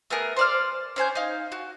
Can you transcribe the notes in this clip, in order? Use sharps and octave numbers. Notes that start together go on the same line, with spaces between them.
A3 B3 G#4 A#4
C5 D5 F6
C#4 C5 G#5 G6
D#4 F5
F#4